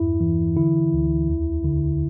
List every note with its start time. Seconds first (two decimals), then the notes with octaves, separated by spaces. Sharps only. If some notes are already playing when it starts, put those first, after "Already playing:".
Already playing: E2 G2 E4
0.20 E3
0.56 D3 E4
0.93 D2
1.28 E2
1.64 D3